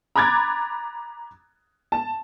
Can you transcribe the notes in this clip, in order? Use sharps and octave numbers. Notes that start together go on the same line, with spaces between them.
A#5 B5 D6 F#6 G#6 A6
A5